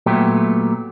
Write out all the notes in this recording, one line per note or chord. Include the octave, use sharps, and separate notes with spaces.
A#2 F#3 A3 B3 G4